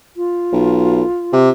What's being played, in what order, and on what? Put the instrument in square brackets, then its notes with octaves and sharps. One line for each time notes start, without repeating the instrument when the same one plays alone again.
[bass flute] F4
[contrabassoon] B1
C3